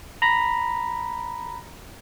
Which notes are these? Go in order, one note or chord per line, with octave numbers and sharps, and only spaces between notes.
A#5 B5 A#6